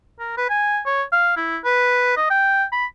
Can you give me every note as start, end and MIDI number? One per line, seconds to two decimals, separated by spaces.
0.20 0.37 70
0.38 0.46 71
0.50 0.80 80
0.86 1.03 73
1.13 1.34 77
1.37 1.58 64
1.65 2.14 71
2.17 2.29 75
2.30 2.65 79
2.72 2.86 83